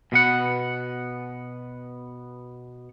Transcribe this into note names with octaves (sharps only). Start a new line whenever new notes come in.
B2 B3 F#5